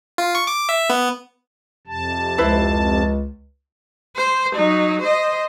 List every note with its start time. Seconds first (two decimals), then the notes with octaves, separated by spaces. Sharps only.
0.18 F4
0.35 C#6
0.47 D6
0.69 E5
0.90 B3
1.87 F2 C3 A5
2.38 C#2 E4 B4 C5
4.16 C5
4.55 F#3 D#4
5.02 C5 D#5